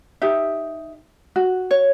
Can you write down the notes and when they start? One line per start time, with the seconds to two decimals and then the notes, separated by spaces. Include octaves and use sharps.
0.22 D#4 G4 E5
1.36 F#4
1.71 C#5